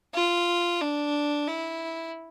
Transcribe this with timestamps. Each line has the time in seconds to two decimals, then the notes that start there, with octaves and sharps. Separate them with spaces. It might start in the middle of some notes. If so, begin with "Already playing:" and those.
0.14 F4
0.81 D4
1.48 E4